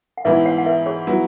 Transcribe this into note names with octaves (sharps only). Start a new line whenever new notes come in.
F#5
G#2 E3 B3 E4 B4 E5
C#5 F#5
F#5
B4 E5
G#4 C#5
F#3 B3 E4